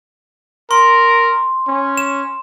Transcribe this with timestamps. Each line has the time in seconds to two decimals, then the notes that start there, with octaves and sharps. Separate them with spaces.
0.71 A#4 C6
1.68 C#4
1.97 E7